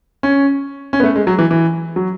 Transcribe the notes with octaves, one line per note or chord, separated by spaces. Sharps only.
C#4
C#4
B3
A3
G#3
F#3
E3
E3
F#3